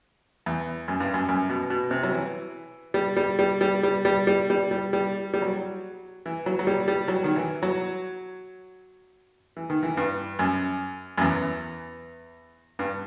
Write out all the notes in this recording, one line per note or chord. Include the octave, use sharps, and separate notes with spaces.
E2
F#2
G2
F#2
F#2
B2
B2
C3
F#3
E3
G3
G3
G3
G3
G3
G3
G3
G3
G3
G3
G3
F#3
E3
F#3
F#3
G3
G3
F#3
D#3
E3
F#3
E3
D#3
E3
G2
F#2
F#2
E2
G2